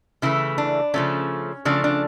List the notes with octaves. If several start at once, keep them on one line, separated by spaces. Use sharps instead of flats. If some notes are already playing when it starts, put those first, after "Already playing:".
C#3 E3 A3 E4
D4
C#3 F3 A3 C#4
C#3 F3 A3 D4
D4